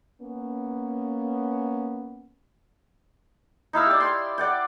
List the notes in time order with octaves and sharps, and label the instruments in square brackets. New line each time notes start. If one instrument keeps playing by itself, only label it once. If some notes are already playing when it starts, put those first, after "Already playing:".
[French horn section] A#3 B3 C#4
[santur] D#4 E4 F5 E6
G4 D5
G5 C6
D5 F#5 G5